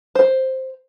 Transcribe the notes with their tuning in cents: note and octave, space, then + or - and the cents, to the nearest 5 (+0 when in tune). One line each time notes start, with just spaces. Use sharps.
C5 +5